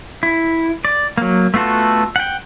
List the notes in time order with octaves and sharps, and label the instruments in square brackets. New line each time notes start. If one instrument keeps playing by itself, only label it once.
[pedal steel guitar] E4
D5
F#3 A#3
A3 B3 F4 F#4 A4
F#5 G5